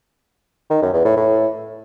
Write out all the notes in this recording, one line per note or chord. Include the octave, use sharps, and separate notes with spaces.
D#3
F#2
E2
A2
A2